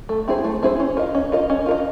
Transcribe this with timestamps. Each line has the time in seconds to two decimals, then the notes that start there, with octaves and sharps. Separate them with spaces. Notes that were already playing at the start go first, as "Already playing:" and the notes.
0.09 A3
0.28 C4 E4 G#4 C5
0.44 A3
0.63 C4 E4 G#4 C5
0.80 C#4
0.97 F4 A#4 D#5
1.15 C#4
1.32 F4 A#4 D#5
1.50 C#4
1.66 F4 A#4 D#5